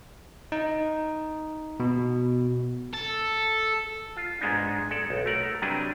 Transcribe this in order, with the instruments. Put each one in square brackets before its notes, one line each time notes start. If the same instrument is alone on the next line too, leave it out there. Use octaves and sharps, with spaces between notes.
[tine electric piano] D#4
B2
[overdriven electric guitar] A4
[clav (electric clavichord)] F4
G#2 G#3 B3 D4 D#4
G#3 A4 D5
B1
A3 A#4 F#5
C3 F#3 G3 D4 B4